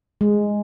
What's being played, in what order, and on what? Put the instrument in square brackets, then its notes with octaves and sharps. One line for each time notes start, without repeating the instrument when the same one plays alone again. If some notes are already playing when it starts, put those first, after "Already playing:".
[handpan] G#3